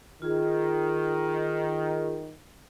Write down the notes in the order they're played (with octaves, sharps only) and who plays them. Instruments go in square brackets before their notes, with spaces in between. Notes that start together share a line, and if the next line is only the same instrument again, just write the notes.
[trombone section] D#3 [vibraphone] F4 G#4